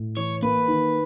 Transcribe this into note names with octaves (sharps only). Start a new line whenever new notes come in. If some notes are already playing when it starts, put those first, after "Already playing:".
Already playing: A2
E3 C#5
A#3 B4
D#3